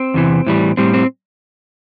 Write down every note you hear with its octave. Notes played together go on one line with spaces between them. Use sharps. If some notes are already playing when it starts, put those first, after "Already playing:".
Already playing: C4
E2 C3 E3
A2 E3 G3
A2 G3 C4
C4